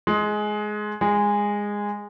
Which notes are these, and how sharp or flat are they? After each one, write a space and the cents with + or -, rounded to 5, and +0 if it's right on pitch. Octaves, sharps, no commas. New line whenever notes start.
G#3 +15
G#3 -15